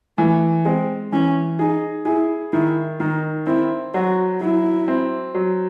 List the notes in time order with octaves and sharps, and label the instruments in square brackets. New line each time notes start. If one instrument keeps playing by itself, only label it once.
[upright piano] E3 [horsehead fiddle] A3
[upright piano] G#3 [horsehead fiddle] C4
[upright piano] E3 [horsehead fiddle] C#4
[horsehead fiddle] D#4 [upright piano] G#4
[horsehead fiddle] E4 [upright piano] G#4
[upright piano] D#3 [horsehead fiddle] E4
[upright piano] D#3 [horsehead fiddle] D#4
[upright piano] C4 [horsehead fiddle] E4
[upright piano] F#3 [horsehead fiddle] F#4
[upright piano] F#3 [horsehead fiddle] E4
[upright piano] C4
F#3